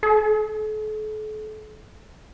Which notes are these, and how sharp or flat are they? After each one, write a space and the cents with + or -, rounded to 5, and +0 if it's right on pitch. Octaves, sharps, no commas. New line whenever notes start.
A4 -40